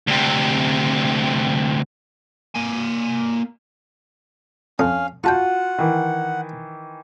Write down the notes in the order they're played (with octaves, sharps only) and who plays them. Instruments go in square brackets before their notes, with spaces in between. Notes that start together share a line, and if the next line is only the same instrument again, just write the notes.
[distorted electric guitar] D2 C3
A#3 G#5
[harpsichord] F2 D#6 [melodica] C#4 F5
[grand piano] F4 F#4 [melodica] F#5 [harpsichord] G5 A5 C#6
[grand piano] D#3 E3